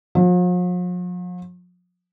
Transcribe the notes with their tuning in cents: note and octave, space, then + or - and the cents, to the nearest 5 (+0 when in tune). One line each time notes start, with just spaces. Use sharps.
F3 +45